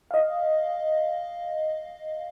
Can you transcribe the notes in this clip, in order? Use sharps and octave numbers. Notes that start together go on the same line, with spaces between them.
D#5 F5